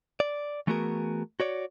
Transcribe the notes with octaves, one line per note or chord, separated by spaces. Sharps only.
D5
E3 A3 B3 F#4 G#4 A#4
F#4 C#5 D5